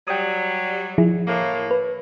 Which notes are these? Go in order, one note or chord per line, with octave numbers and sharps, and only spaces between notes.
F#3 G3 G5 D#6
F3 E4 G#4
A2 A#3
B4